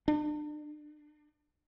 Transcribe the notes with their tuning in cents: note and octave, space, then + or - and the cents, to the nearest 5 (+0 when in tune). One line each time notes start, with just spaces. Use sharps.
D4 +35